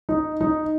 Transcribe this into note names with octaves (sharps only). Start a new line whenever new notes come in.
D#4
D#4